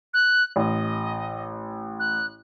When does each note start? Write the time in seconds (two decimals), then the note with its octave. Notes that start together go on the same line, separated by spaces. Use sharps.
0.14 F#6
0.56 A1 D#5
2.00 F#6